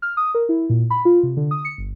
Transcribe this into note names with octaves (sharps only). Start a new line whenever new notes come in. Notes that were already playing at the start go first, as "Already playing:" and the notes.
F6
D#6
A#4
E4
A#2
B5
F4
C3
D3
D#6
C#7
G1